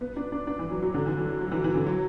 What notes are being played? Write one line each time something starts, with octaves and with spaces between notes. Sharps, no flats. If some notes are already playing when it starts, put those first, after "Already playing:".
B3
D4
D4
D4
E3
F#3
F#3
D3
E3
F#3
F#3
E3
E3
D3
F#3